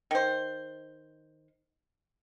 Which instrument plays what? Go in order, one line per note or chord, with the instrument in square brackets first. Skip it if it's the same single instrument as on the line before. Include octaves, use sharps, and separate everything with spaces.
[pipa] D#3 C5